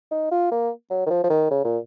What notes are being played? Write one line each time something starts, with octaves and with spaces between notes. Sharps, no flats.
D#4
F4
A#3
F#3
D#3
F3
F3
D#3
C#3
A#2